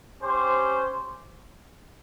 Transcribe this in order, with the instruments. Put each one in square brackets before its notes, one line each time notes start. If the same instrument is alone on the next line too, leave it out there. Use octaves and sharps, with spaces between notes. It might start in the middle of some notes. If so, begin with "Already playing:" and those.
[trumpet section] C#4 G4 C5